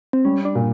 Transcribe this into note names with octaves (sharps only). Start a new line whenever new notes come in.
C4
G3 C#4
D4
A#2